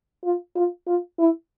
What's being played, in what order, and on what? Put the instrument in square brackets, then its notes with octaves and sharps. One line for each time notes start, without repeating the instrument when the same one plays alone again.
[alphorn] F4
F4
F4
E4